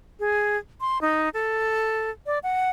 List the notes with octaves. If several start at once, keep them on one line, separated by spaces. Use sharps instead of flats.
G#4
C6
D#4
A4
D5
F#5